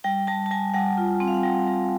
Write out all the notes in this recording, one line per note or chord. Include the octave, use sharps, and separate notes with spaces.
G3 G5
G3 A5
A5
G3 G#5
G3 F#5
F4
C4 F#5
F5
F#5
G3 G5
G3